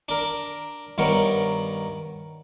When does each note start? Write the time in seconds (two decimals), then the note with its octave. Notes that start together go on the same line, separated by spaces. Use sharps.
0.09 D4 A#4
0.98 G2 D#3 B3 A#4 C#5